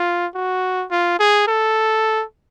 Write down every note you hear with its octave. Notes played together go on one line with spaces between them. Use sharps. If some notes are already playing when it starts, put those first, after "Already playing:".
Already playing: F4
F#4
F4
G#4
A4